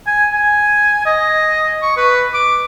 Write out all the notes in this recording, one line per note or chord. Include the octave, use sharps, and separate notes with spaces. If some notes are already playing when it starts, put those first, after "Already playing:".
G#5
G#5
D#5
C#6
B4
D6